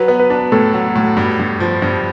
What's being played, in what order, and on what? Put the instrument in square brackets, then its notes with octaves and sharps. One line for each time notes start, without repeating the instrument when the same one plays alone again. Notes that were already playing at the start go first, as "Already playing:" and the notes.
Already playing: [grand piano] F#3 [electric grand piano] B4
[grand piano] B3
[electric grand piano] B4
[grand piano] D4
[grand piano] A2 [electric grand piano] A4
[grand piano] F#3
A2
G2
G2
F3
G2